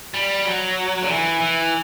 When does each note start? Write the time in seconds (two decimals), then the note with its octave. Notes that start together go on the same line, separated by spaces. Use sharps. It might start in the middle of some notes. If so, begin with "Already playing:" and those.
0.14 G3
0.45 F#3
1.02 D3
1.09 E3
1.41 E3